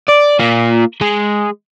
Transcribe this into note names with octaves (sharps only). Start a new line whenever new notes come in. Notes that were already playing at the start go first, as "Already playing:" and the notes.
D5
A#3 F4
G#3